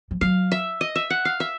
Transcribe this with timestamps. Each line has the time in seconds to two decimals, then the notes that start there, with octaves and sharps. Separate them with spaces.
0.11 F3
0.21 F#3 F5
0.52 E5
0.81 D#5
0.96 E5
1.10 F#5
1.25 F5
1.40 E5